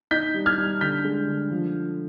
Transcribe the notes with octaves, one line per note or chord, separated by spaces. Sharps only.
D#4 G6 B6
G3
F6 G#6
G3
D3 G6 B6
G#3
D3
F3